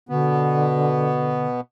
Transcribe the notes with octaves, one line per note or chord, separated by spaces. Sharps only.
B2 D3 B3